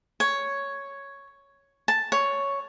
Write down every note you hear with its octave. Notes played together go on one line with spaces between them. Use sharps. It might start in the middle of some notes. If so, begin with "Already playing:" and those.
C#5
A5
C#5